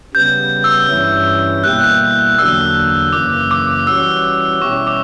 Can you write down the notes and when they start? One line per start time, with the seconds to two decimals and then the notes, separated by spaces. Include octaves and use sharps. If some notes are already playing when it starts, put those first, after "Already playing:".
0.14 C#3 G3 B3 G6
0.64 E6
0.90 G2 E3 G3 C#4 E4
1.64 B2 G3 A#3 E4 G4 F#6
2.38 E2 D3 F#3 A#3 D4 E6
3.13 F#2 C#3 E3 A#3 D6
3.51 D6
3.87 E3 G3 C#4 F#4 E6
4.62 B2 G3 C#4 E4 G4 C#6
4.87 D6